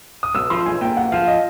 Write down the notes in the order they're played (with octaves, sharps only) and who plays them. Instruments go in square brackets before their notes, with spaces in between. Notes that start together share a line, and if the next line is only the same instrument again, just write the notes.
[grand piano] D#6
[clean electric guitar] B1 [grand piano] E6
[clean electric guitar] F3 [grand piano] C6
[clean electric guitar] B1 [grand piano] G#5
[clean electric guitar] A#2 [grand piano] G5
[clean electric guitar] B1 [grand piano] F#5
[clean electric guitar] F3 [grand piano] F5
[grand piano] D#5